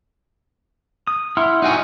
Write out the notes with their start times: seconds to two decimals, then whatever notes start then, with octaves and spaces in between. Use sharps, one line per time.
1.07 D#6
1.37 E4 F#5 C6 F6
1.62 D#4 F#4 G#5